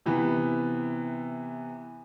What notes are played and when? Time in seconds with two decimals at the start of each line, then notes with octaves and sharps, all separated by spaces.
0.06 C3 E3 B3